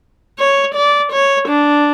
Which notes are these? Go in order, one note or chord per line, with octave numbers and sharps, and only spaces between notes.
C#5
D5
C#5
D4